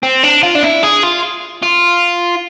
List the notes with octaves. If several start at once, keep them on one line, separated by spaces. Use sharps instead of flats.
C4
D4
F4
D4
E4
G#4
F4
F4